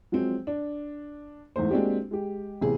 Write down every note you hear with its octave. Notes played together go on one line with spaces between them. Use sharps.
F3 F#3 G#3 C4
D4
E2 G#2 A3 C5
G#3 A#3 C4 D4 F#4 G4
G#3 G4
A1 C3 B3 G#4